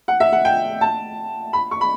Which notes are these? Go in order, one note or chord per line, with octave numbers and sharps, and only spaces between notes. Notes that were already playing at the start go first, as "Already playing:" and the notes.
F#5
E5
F#5
G5
A5
B5
C#6
B5